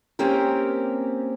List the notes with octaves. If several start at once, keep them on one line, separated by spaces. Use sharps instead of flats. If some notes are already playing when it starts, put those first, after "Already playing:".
A#3 C4 C#4 G4 A#4